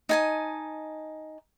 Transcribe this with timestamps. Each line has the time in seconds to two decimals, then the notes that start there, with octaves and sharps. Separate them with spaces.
0.09 D#4 G#5 A5